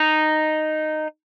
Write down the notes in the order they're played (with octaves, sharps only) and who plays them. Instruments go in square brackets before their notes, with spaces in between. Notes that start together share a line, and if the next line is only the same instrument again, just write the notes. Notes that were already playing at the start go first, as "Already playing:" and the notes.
Already playing: [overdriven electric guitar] D#4